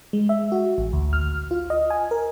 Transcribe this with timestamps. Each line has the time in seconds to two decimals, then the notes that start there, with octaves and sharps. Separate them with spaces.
0.13 G#3
0.29 E5
0.52 F#4
0.78 A1
0.93 D2
1.13 F6
1.51 F4
1.70 D#5
1.90 G#5
2.11 A#4